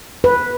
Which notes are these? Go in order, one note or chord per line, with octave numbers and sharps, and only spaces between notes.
B4